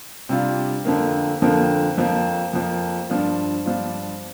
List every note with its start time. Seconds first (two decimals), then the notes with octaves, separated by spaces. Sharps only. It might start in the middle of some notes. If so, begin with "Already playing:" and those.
0.29 C3 G3 D4 F4
0.85 F2 D3 F3 A#3
1.42 F2 D3 F3 A#3
1.97 F2 F3 A#3
2.53 F2 F3 A#3
3.10 G2 F3 D4 F4
3.66 G2 F3 D4 F4